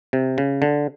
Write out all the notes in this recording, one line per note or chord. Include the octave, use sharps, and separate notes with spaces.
C3
C#3
D3